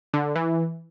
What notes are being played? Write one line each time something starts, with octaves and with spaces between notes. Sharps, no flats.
D3
E3